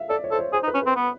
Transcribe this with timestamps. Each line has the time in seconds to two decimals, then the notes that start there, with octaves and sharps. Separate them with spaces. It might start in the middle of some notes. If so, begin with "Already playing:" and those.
Already playing: E5 F5
0.10 A4 D5
0.24 C#5
0.31 A4 C5
0.39 C#5
0.53 G#4 C5
0.63 D#4
0.68 B4
0.74 C#4
0.82 C4 B4
0.96 B3